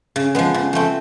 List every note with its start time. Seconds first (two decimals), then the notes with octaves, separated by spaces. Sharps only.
0.16 C#3
0.35 F3 G#3 B3
0.54 C#3
0.73 F3 A3 C4